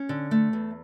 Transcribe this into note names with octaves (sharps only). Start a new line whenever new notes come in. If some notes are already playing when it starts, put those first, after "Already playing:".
Already playing: C#4
D3
A3
E2